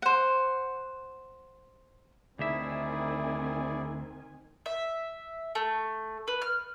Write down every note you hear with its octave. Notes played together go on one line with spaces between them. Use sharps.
C5 F#5
D2 D#3 C4 E4 G#4 D5 E5 G#5
E5
A3
B4
F6